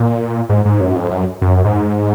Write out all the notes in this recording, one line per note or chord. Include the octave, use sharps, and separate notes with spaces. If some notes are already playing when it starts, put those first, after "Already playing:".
Already playing: A#2
G#2
G#2
F#2
F2
F#2
F#2
G#2